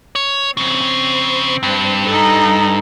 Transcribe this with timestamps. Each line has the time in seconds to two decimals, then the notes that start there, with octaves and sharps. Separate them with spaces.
0.15 C#5
0.57 F2 C#3 C4
1.63 G2
2.07 D#4 A4